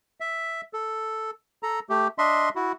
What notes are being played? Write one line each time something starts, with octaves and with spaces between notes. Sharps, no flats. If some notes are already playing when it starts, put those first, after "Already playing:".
E5
A4
A4 A#5
A3 G4
D4 D#5 E5 C6
E4 F#4